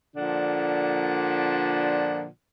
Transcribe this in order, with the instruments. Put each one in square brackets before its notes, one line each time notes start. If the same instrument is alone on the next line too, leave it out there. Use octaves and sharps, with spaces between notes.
[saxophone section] A#2 D3 F3 D4 F#5